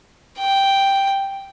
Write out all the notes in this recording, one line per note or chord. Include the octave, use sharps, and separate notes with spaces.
G5